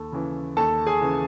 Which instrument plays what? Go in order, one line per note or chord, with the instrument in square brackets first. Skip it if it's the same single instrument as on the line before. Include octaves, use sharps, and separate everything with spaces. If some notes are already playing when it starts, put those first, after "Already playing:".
Already playing: [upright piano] D#2 A4
C#3 E3
D#2 A4 A5
G#4 G#5
C#3 E3